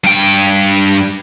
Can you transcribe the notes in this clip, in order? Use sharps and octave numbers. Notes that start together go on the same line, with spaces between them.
G2 G5